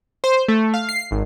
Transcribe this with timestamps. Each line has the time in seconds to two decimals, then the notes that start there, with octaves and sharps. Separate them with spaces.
0.24 C5
0.48 A3
0.74 F5
0.89 C7
1.11 G#1